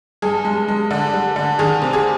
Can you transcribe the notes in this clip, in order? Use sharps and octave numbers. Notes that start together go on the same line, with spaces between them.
G2 G#4
G#3
G#3
D3
G3
D3
D#3 G#4
C3
G#4